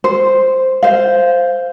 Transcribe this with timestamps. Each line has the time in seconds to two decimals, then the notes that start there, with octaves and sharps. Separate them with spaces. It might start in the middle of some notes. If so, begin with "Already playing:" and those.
0.04 C5
0.83 C5 F5